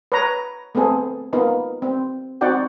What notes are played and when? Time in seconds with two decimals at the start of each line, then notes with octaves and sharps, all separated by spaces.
0.12 B4 C#5 A#5
0.75 A3 B3 C4 G#4 A4
1.33 A#3 B3 D#4 F4
1.82 C4
2.41 C4 D#4 F#4 D5 F#5 G5